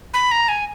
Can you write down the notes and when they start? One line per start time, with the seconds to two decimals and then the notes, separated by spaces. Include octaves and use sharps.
0.14 B5
0.31 A#5
0.49 G#5